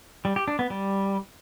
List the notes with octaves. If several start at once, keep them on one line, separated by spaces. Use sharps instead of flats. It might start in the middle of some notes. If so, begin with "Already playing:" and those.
G3
G4
D4
B3
G3